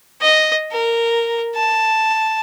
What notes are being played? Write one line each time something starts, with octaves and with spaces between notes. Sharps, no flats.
D#5
A#4
A5